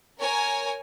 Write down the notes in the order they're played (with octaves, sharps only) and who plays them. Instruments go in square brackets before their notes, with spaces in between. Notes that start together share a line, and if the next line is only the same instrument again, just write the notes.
[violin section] A#4 C#5 G#5